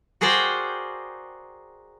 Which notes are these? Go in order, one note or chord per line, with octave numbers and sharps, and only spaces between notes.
F#4 G#4 A#4 C5 D5 G5